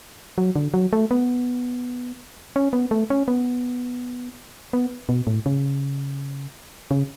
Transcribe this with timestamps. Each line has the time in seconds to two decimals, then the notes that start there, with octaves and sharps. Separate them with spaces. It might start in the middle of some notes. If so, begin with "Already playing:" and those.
0.38 F#3
0.56 D3
0.74 F#3
0.93 A3
1.11 B3
2.56 C#4
2.73 B3
2.91 A3
3.10 C#4
3.28 B3
4.73 B3
5.09 B2
5.27 A2
5.46 C#3
6.91 C#3